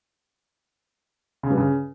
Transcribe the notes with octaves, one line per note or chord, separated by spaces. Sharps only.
C#3
G2
C#3